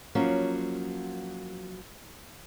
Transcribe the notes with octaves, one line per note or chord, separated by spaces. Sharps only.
F3 F#3 A#3 C#4